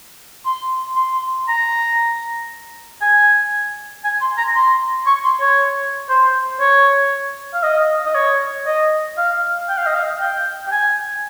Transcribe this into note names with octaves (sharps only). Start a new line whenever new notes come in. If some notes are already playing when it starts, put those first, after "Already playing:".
C6
C6
A#5
G#5
G#5
C6
A#5
C6
C#6
C6
C#5
C5
C#5
F5
D#5
D#5
C#5
D#5
F5
G5
F5
D#5
F5
G5
G5
G#5